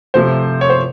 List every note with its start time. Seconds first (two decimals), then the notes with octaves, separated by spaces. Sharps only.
0.14 C3 F3 A3 C5
0.61 C#5
0.70 C5